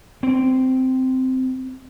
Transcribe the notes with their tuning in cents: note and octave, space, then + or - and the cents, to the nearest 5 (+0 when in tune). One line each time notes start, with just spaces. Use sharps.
C4 -10